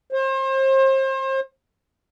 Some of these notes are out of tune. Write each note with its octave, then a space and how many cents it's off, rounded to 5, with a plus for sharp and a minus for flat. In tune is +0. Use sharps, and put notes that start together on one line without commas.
C5 +35